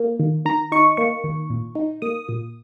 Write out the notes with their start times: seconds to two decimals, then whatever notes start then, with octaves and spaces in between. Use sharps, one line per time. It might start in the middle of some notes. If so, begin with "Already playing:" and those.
Already playing: A#3
0.19 D#3
0.45 D#3 A#5
0.72 D#4 C#6
0.97 A#3 C#6
1.24 D#3
1.50 A#2
1.75 D#4
2.02 A#3 D#6
2.29 A#2